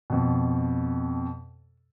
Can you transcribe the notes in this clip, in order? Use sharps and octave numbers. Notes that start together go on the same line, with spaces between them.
F2 B2